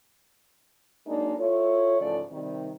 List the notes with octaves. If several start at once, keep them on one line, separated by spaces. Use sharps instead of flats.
F#3 G#3 A#3 D4 D#4
E4 F4 A4 C#5
G#2 C#3 E3 F3 A3 D5
C3 D#3 G3